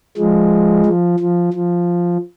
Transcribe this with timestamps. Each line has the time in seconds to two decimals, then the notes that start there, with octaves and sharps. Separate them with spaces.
0.17 F3 G#3
0.86 F3
1.19 F3
1.53 F3